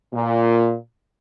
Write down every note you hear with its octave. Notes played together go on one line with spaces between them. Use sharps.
A#2